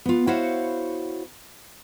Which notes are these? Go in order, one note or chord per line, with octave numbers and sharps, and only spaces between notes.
B3 F4
E4 F#4 C5 C#5 F5 F#5